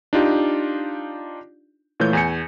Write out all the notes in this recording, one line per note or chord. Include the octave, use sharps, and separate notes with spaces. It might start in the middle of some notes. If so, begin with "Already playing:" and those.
D4 D#4 F4 G4
A#2 E3 A3 C#5 G6
E2 G#5 C#7